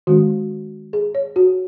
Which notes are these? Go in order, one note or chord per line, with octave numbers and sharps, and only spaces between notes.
D#3 G#3 C#4 F#4
G#4
C#5
F#4